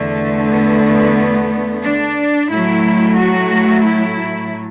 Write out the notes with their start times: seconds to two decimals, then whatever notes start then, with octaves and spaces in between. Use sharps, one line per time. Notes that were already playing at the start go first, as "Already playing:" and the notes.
Already playing: E2 D3 A3
0.50 B3
1.83 D4
2.49 A2 F#3 A3 E4
3.15 F#4
3.82 E4